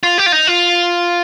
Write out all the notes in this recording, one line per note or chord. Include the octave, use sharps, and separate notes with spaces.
F4
G4
F4
D#4
F4